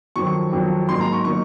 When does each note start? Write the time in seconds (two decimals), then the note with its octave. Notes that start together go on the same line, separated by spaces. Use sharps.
0.16 F2 D#3 F#3 C#6
0.52 F2 D#3 F#3
0.88 G#2 F#3 A#3 D#4 C6
1.01 A#5
1.13 C#6
1.25 F#3 A#3 D#4 C#6